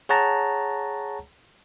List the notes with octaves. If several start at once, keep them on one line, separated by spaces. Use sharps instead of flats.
G#4 C#5 F#5 A5 A#5